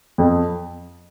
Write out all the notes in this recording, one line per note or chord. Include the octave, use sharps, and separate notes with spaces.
F2